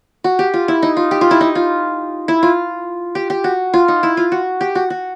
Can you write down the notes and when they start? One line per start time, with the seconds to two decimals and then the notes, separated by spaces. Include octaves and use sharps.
0.24 F#4
0.39 G4
0.54 F4
0.68 E4
0.83 D#4
0.97 F4
1.11 G4
1.21 F4
1.31 E4
1.41 D#4
1.55 F4
2.28 E4
2.43 F4
3.15 G4
3.30 G4
3.44 F#4
3.74 F4
3.88 D#4
4.03 E4
4.17 F4
4.32 F#4
4.61 G4
4.75 F#4
4.90 F#4